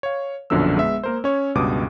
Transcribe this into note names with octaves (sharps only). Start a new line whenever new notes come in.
C#5 F5
A#1 F#2 B2 D3 F3 E6
G#3 B3 E5
A#3 A#4 C5
C#4 C#5
C#2 G2 B2 D6 D#6